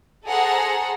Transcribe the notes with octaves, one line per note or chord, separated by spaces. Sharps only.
G#4 A4 C5 F#5 A#5